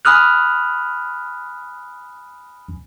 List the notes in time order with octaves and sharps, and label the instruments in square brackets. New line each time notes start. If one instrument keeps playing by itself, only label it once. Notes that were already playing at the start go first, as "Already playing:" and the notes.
[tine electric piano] G#5 B5 D#6 F6 F#6